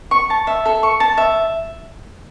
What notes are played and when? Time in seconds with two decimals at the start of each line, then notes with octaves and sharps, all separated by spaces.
0.11 C#6
0.30 A5
0.47 E5
0.66 A4
0.83 C#6
1.00 A5
1.18 E5